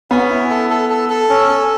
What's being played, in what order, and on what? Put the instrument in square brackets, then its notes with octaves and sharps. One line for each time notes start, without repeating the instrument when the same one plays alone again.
[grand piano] B3 [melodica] C#4
[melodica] E4
A4
A4
A4
A4
C#4
A4